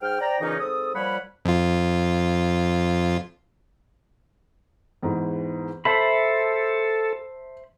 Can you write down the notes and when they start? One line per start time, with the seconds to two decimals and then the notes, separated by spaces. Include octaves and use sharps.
0.02 G#2 G5 F6
0.21 C5 D5 G5 A#5
0.41 A#2 C#3 E3 C#4 D#4
0.60 G#2 C4 A4 D#6
0.95 A#2 F3 G3 C#5 F#5 B5
1.45 F2 F4
5.03 E2 G#2 E3
5.85 A4 C5 E5 A5 B5